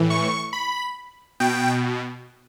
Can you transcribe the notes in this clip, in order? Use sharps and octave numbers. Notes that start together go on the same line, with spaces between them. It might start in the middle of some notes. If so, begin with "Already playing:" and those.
Already playing: A2 E3
C#6
B5
B2 G5